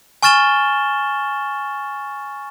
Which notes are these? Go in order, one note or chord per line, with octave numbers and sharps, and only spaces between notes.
G#5 C#6 F6 A6 E7 G7